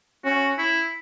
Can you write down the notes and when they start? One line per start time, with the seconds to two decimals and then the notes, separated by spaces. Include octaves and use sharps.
0.25 C#4 F#4
0.58 E4